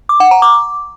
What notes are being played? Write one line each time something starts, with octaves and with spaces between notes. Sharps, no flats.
D6
F#5
A#5
D6